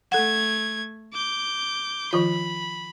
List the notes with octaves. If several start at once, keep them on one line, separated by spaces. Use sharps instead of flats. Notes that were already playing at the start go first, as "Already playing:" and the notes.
A3 A4 F#5 G#6
D6 G6
D#3 F3 F4 B5